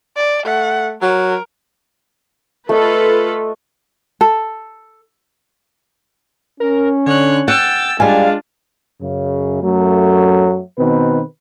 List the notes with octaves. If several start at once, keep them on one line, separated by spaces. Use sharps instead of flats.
D5
A3 F#5
F#3 A#4
A3 F4 A4 B4 D#5
A4
C#4 A#4
D3 C#5 F#6
F#5 G5 E6 A6
G3 G#3 D4 F4 F5 G#5
F#2 C#3
F#2 F#3 A3
B2 D#3 C4 B4